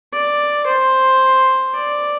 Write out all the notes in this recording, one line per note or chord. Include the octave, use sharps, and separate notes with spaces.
D5
C5
D5